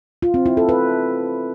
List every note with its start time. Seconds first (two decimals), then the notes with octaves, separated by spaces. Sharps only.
0.23 F4
0.34 C4
0.46 E4
0.57 A4
0.69 B4